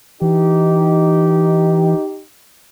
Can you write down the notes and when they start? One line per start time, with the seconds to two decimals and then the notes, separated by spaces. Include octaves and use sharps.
0.22 E3 D#4 G4